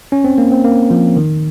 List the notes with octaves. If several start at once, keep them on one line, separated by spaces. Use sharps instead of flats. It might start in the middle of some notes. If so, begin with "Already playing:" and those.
C#4
C4
A#3
C4
A#3
F3
D#3